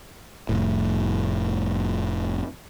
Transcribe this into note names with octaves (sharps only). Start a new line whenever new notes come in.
F1 A2